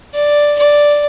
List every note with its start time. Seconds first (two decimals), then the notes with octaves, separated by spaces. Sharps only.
0.14 D5
0.59 D5